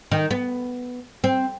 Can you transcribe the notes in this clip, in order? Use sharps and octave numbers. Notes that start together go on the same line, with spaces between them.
D#3
B3
C4